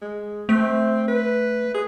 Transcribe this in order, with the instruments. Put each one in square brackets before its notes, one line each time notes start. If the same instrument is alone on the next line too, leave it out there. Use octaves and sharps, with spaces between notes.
[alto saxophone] G#3
[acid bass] A3 [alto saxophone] C4
[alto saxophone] B4
G#4